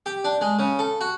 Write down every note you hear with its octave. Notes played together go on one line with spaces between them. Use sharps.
G4
D4
G#3
C#3
A4
F#4